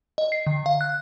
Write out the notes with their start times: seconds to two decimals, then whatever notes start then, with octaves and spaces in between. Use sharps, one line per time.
0.18 D#5
0.32 C7
0.47 D3
0.66 F5
0.81 F#6